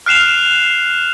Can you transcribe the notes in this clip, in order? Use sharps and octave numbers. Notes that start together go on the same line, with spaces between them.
F6 F#6 C7 E7 F7